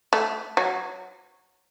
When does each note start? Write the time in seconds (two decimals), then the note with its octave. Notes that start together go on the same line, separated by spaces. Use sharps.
0.13 A3
0.57 F#3